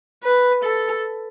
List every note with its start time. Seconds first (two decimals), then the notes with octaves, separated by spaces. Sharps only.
0.24 B4
0.64 A4